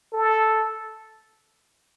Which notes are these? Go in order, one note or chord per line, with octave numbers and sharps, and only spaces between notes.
A4